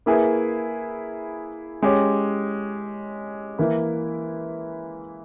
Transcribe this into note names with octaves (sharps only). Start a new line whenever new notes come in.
A#3 E4 G#4 B4
G#3 C#4 G4 C#5
E3 A#3 E4